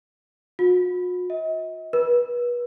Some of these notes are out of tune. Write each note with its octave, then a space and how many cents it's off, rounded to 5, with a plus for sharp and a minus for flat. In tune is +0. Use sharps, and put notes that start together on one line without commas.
F#4 -45
D#5 +40
B4 -35